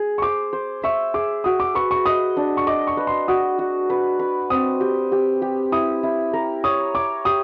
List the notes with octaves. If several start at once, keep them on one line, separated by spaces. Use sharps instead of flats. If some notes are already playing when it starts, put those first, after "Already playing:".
Already playing: G#4
C#6
C5 D6
C5
E5 C#6
G#4 D6
F#4 D#6
D6
B4 C#6
C#6
D#5 D#6
D4
C#6
D#5 D6
C#6
B4
C6
F#4 D#6
F#4
B4
B4
C4 D#6
G4
G4
G4
E4 D#6
E4
A#4
C#5 D#6
C#5 D6
G4 D#6